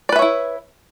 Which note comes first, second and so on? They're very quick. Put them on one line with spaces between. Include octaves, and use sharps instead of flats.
D5 B4 E5 C#5 E4